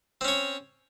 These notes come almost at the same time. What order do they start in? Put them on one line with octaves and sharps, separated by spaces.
C4 C#4 C#5